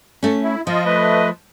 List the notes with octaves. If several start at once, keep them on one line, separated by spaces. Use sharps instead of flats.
A3 C#4
E4
F3 F4 D#5
A3 B4 D#5